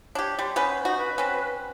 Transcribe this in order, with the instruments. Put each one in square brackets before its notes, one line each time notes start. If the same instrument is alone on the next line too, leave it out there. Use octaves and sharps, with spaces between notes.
[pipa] D4 G4 [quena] C#5
[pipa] G3 [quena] C6
[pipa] B3 C#4 B4 [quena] C5
[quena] D#4 [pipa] F#4
[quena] B4
[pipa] C4 C#4